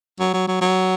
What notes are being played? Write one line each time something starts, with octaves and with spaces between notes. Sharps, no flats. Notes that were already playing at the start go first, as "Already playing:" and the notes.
F#3
F#3
F#3
F#3